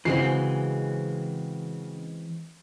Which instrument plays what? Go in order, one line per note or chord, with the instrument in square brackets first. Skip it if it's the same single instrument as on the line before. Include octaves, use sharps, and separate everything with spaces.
[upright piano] C#3 F#4 C7 [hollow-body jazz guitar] E3 G#3 C4